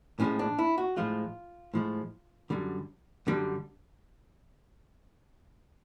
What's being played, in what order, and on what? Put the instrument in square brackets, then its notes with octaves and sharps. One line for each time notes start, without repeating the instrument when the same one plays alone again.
[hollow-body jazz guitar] A2 F3 G#3 C#4
D4
E4
F#4
A2 F3 G#3 F4
A2 F3 G#3
F#2 D3 G3
F#2 D3 G3